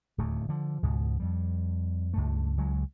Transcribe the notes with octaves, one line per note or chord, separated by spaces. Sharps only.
D1 D#2 A3
D3 F3
C#2 G#2 B2
F2 G3
C#2 G2 A3
C#2 F#3 G#3